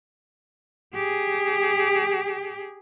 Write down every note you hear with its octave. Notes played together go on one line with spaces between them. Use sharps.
G4 G#4